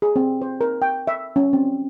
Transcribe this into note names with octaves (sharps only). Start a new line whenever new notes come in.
G#4
C4
C5
A#4
G5
E5
C#4
C4